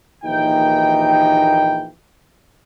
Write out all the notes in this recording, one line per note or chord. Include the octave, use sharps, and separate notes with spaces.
A#1 D#2 E3 D#4 G5